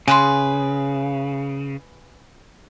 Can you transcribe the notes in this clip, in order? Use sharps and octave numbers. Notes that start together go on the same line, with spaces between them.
C#3 G#4 B4 C6